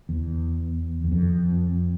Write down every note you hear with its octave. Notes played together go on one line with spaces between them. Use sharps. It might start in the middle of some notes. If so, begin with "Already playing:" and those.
E2
E2
F2